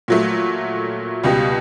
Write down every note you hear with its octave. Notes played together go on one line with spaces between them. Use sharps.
A#2 F#3 A3
C#2 B2 G3